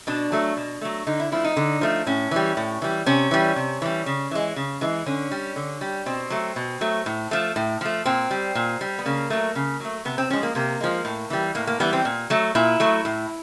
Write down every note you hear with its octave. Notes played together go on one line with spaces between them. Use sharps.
B2 D4
F#3 A3
B2
F#3 A3
D3 D#4
E4
F3 A3 E4
D#4
D3
F3 A3
A2 C#4
E3 G3
A2
E3 G3
C3 C#4
E3 G3
C3
E3 G3
C#3
E3 G#3
C#3
E3 G#3
D3 C#4
G3
D3
G3
B2 C4
F#3 A3
B2
F#3 A3
A2
F3 A3
A2
F3 A3
A#2 C4
G3
A#2
G3
B3
C#3 A#3
F#3 A3
C#3
F#3 A3
C3 B3
C4
F3 G#3 C#4
A#3
C3 A#3
F3 G#3
A2
E3 G3
A2 A#3
A#3
E3 G3 B3
C4
A#2
F#3 A3
A#2 E4
F#3 A3
A2